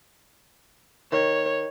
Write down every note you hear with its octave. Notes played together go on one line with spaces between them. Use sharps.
D#3 C#5